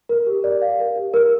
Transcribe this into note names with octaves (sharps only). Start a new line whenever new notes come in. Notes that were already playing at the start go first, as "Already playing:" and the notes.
A#4
G4
D5
F5
A#4
G4
A#4